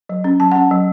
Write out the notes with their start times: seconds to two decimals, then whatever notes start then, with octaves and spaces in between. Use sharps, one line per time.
0.09 F#3
0.24 C#4
0.40 F#3 A5
0.52 C#4 F#5
0.71 F#3